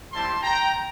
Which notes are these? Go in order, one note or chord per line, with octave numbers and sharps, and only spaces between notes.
G3 C4 E4 G4 A5 C6
G5 A#5